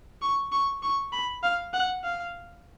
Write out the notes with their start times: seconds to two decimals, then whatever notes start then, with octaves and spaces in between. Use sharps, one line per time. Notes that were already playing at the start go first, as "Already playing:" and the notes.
0.22 C#6
0.52 C#6
0.83 C#6
1.12 B5
1.43 F5
1.73 F#5
2.04 F5